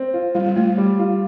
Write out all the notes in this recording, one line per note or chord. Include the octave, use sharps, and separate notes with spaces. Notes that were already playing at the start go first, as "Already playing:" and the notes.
Already playing: C4
F4
G3 F4
G3
A3 F4
G3
F4